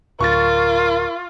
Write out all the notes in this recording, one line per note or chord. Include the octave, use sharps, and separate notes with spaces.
D1 F4 A#4 C#6 A6